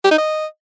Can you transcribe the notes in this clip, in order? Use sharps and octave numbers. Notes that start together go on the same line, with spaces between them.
G4
D#4
D#5